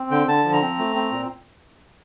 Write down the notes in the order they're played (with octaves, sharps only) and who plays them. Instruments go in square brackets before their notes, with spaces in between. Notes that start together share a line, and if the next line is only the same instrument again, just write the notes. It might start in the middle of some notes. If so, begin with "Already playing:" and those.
Already playing: [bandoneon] C4
D3 G5
D3 A5
F3
A#5
C4
A3
C4
A#2